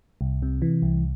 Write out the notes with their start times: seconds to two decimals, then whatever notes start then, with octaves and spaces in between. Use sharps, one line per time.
0.21 C2
0.42 C3
0.62 E3
0.82 C2